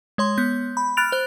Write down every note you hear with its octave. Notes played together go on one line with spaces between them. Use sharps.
G#3 C#5 C6
B3 G6
B5
B5 F6 F#6 A6 D7 F7
C5 F#6